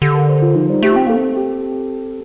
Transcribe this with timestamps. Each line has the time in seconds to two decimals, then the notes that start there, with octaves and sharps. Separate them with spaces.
0.02 D3 G4
0.15 A#4
0.29 C5
0.42 F4
0.55 F3 D#4
0.70 G3 D#4
0.83 A3 G4
0.92 C4 F4
1.07 A#3 A4
1.16 C4
1.37 G4